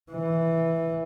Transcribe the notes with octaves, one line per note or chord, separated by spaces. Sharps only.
E3